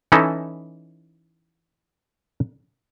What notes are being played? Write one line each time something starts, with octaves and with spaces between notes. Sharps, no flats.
E3 C#4 D#4 E4 A4 D#5